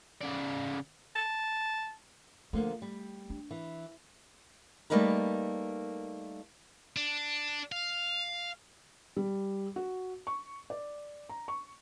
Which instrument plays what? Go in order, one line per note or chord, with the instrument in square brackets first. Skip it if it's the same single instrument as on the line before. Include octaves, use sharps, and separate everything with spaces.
[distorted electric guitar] C#3 D5
[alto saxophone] A5
[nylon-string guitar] D3 F3 A#3 [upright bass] A3
[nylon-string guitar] G3
[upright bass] D4
[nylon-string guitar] E3
G3 A3 A#3 D#4 A#4 B4
[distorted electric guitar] D4
F5
[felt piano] G3
F#4
C#6
D5
A#5
C#6